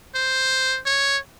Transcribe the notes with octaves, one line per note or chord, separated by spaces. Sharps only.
C5
C#5